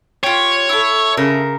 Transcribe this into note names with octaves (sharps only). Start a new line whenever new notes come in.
F4 G4 C#5
E4 A4
C#3 A#4